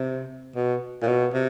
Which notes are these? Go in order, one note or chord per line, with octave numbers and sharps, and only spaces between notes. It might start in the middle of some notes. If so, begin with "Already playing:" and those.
Already playing: C3
B2
A#2
B2
C3